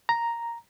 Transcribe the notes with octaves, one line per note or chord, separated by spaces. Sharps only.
A#5